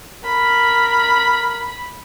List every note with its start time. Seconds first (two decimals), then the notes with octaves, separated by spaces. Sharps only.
0.25 A#4 B5